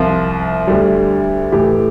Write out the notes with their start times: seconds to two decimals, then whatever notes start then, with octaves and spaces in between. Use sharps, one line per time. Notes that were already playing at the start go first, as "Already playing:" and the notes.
Already playing: C2 C3 F3 F5
0.67 D2 D3 G3
1.52 A2 E3 A3 G4